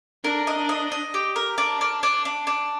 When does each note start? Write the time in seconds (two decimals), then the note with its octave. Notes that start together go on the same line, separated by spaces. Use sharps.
0.24 D4 A#4
0.47 D#5
0.57 D4
0.69 D#5
0.92 D#5
1.14 G4
1.36 A#4
1.58 D4
1.81 D4
2.03 D4
2.25 D4
2.47 D4